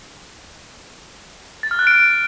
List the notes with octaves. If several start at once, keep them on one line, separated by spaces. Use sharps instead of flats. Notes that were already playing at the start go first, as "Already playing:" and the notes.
A6
F6
F#6
D7